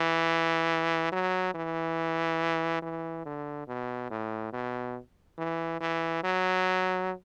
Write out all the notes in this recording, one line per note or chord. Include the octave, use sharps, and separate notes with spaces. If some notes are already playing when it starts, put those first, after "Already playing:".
Already playing: E3
F#3
E3
E3
D3
B2
A2
B2
E3
E3
F#3